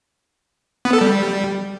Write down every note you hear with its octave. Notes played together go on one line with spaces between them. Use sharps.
B3
A4
G3